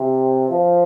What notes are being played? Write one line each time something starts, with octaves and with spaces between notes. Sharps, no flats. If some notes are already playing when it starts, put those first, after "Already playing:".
Already playing: C3
F3